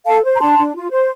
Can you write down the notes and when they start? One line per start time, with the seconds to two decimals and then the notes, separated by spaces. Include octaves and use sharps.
0.06 A4 F5 A5
0.24 C5
0.35 A#5
0.40 D4 A5 C6
0.58 D4
0.75 F4
0.91 C5